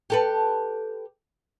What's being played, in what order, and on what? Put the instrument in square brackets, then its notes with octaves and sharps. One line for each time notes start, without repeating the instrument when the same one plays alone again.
[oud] G4 A4 B4